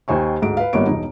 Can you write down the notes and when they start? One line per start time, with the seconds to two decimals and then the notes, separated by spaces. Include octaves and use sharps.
0.08 D#2 D#3 C5 G#5 C#6
0.42 D2 G#2 G#3 D7
0.57 B4 F5
0.73 G#1 G2 A#3 B3 C#5 D7
0.87 E1 D#4